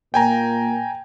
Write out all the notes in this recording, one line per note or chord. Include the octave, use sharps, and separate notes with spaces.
A#2 A#3 G5 G#5 A#5